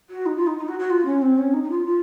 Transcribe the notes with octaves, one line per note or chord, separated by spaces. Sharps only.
F#4
D#4
F4
D#4
D#4
F#4
F#4
F4
C#4
C4
C#4
D#4
D#4
F4
F4